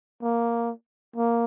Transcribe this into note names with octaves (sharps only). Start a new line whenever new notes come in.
A#3
A#3